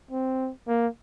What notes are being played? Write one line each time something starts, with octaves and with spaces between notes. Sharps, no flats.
C4
A#3